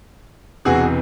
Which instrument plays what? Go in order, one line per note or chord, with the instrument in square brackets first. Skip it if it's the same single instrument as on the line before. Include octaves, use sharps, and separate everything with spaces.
[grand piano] E1 E2 C3 E3 F#4 G#4